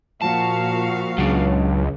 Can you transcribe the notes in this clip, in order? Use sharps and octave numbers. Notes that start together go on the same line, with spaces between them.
A#2 F3 F#4 F5 A5
C#2 C#3 F#3 D4